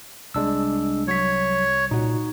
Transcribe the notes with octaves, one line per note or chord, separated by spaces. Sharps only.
C2 G#3 D4 E6
F#3 C#5 B6
A#2 D#4 F#4